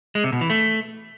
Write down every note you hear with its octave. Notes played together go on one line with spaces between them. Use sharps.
G#3
C3
B2
E3
A3